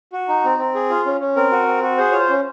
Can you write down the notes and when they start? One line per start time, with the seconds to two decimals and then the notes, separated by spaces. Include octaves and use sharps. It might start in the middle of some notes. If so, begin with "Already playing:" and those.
0.13 F#4
0.29 D#4
0.44 C4
0.59 C4
0.75 G#4
0.90 F4
1.06 C#4
1.20 C#4
1.36 C4 A#4
1.52 F#4
1.67 C4
1.83 F#4
1.98 G#4 C5
2.12 F4 C#5
2.19 C5
2.29 C#4